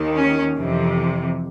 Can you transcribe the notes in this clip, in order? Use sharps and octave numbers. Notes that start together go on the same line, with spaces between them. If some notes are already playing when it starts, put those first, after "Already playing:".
Already playing: D#2 D#3
C#4
F2 C3 E3